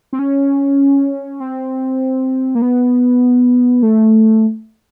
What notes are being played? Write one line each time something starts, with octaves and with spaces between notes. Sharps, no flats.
C4
C#4
C4
A#3
B3
A3